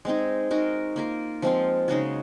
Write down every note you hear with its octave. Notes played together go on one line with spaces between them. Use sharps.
G#3 C4 D#4 G#4
G#3 D#4 F#4 A#4
A#3 F4 A#4
F3 G#3 C4 F4
C#3 G#3 D#4 F#4